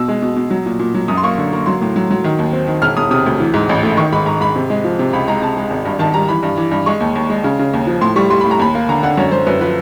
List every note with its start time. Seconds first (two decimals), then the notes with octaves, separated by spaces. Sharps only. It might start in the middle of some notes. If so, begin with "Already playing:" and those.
Already playing: B2 E6
0.08 G#3
0.22 B2
0.36 B2
0.50 F#3
0.66 A#2
0.79 A#2
0.94 F#3
1.08 F#2 D#6
1.17 C6
1.23 A#3 C#6
1.38 D3
1.53 A#3
1.66 F#3 C6
1.82 A2
1.96 F#3
2.11 F#3
2.24 D#3
2.39 D#2
2.53 C4
2.68 D#3
2.82 E1 F6
2.97 E1 D#6
3.11 C3 D#6
3.26 D2
3.40 E3
3.54 G#2
3.69 A1
3.83 A3
3.97 D#3 C#6
4.12 G#2 B5
4.26 G#2 A#5
4.41 G#2 B5
4.56 C3
4.70 G#3
4.84 F3
4.99 C3
5.13 C#2 B5
5.28 G#3 A#5
5.42 C3 A5
5.57 G#3
5.70 G#1
5.85 G2
5.99 D#3 A5
6.14 G3 A#5
6.28 E3 B5
6.43 G2
6.57 E3
6.71 G2
6.86 G#3 C#6
7.00 D#2
7.15 D#2
7.30 G#3
7.44 C#3
7.59 C#3
7.73 D#2
7.87 F3
8.01 A2 C6
8.16 G3 C#6
8.30 G3 C6
8.41 A2 B5
8.51 A#5
8.59 D#2 B5
8.75 A#3
8.89 D3 A#5
9.03 D3 F#5
9.18 F#2 C#5
9.32 F#2 C5
9.46 F#2 B4
9.61 F3 B4